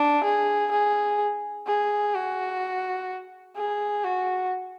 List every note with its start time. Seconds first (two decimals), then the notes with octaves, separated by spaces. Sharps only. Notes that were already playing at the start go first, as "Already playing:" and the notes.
Already playing: D4
0.24 G#4
0.71 G#4
1.67 G#4
2.14 F#4
3.57 G#4
4.04 F#4